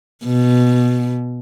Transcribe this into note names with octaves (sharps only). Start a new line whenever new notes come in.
B2